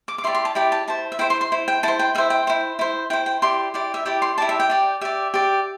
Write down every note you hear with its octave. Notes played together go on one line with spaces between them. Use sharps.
D6
D6
E4 G4 D5 C6
C6
A5
E4 G4 D5 G5
A5
E4 C5 A5
E5
E4 C5 G5
C6
C6
E4 C5
G5
E4 C5 A5
G5
E4 C5 E5
G5
E4 C5
E4 C5
E4 C5 G5
G5
E4 G4 D5 C6
E4 G4 D5
E5
E4 G4 D5 G5
C6
E4 G4 D5 A5
E5
G5
G4 D5
G4 D5 E5
G4 D5